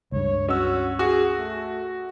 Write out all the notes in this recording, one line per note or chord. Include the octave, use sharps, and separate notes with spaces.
C#2 G2 C#5
C#4 F#4 E6
F#4 G#4
A3